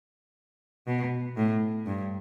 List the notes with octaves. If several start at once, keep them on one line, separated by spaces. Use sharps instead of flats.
B2
A2
G2